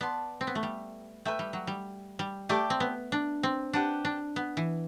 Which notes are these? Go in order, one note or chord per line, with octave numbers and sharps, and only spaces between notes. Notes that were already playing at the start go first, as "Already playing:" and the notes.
B3 D5 A5 C6
C4
B3
A3
G3
A3 B4 E5 G5
G3
F#3
G3
G3
A3 G4 D5 A5 D6
C4
B3
D4
C4
D4 G4 B4 F#5 A5
D4
B3
E3